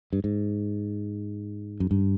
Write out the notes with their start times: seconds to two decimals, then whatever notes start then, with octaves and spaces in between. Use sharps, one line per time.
0.13 G2
0.24 G#2
1.80 F#2
1.91 G2